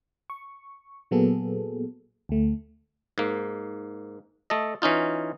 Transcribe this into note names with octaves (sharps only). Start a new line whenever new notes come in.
C#6
A#2 F#3 A#3 B3 G#4 A4
D2 A3
G#2 A#3
A3 A4 D#5
E3 C#4 D#4 F4